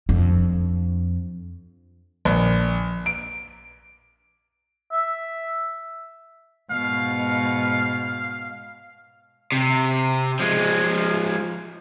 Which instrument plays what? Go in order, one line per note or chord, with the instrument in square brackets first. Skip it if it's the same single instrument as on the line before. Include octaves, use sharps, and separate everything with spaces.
[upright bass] F2 D4
[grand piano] A#1
D7
[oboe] E5
[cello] G#2 B2 [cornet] F5
[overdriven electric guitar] C3
F3 G#3